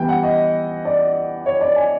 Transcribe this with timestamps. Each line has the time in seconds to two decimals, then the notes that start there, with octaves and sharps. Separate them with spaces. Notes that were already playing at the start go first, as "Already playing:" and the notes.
Already playing: E3 G3 B3 E4 G5
0.09 F#5
0.24 D#5
0.85 D5
1.46 C#5
1.61 D5
1.76 G#5